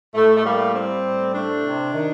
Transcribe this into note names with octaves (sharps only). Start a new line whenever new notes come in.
A2 A3
A3
G3 A#3
G3 C4
A2
A3 D4
C3
D#3